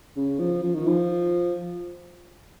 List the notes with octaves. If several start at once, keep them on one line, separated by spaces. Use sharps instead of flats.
C#3
F3
F3
D#3
F3